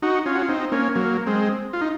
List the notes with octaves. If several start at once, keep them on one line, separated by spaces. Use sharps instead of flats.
D#4 F#4
C#4 F4
F#4
F4
C4 D#4
A#3 C#4
F#3 A#3
G#3 C4
F4
D#4